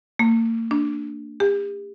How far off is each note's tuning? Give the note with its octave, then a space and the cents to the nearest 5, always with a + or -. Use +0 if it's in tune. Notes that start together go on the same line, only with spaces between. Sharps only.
A#3 -40
D4 +0
G4 +40